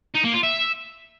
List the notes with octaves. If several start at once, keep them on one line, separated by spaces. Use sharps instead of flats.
D#4
A#3
F4
E5